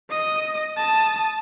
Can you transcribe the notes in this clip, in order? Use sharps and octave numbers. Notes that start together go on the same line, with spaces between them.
D#5 D#6
A5 D#6